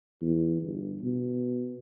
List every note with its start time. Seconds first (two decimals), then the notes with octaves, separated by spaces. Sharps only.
0.22 E2
0.62 G1
1.03 B2